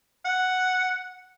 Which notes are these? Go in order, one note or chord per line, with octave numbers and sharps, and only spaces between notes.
F#5